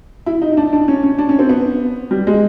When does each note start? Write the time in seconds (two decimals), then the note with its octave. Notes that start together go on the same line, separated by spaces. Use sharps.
0.26 E4
0.42 D#4
0.53 D#4
0.57 D4
0.73 D4
0.88 C#4
1.03 C#4
1.19 D4
1.29 C#4
1.39 C4
1.49 B3
2.11 G3
2.27 G#3